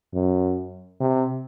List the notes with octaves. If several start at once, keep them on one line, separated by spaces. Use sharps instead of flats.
F#2
C3